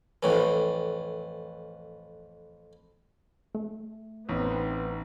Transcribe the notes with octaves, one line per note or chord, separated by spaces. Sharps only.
F2 A2 E3
A3
A1 B3 C4 D#4